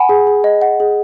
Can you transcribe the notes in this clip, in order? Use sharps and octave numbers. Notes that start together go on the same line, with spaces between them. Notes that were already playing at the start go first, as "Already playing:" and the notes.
Already playing: F#5 G#5 B5
G#4
G#4
D#5
F#5
G#4